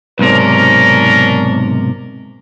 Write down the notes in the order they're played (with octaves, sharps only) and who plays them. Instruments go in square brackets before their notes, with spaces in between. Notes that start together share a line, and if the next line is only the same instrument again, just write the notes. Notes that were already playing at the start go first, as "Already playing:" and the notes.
[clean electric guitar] B1 G#2 C3 [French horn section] C#4 D4 A#4